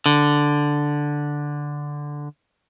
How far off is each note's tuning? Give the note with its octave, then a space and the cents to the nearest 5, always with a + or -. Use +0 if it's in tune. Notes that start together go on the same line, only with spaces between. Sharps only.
D3 +0